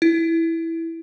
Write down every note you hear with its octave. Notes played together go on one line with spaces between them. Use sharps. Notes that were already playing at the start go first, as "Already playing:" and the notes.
E4